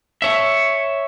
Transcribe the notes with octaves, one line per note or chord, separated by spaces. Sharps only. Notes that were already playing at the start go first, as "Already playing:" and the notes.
C#5 E5